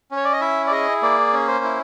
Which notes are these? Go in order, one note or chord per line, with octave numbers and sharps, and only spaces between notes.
C#4
C#5
D5
D#5
E4 E5
D5
G#4 D#5
A#3 D5
C#4
C5
E4